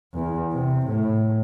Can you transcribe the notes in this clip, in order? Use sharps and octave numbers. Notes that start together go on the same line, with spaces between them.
E2
C3
A2